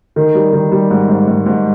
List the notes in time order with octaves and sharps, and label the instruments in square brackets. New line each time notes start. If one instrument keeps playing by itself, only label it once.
[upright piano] D#3
G3
D#3
G3
G#2
G#2
G#2
G#2